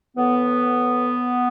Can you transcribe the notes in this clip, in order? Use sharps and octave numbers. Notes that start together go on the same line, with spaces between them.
A2 E3 B3